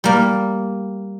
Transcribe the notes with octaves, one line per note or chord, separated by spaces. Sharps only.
G3 A#3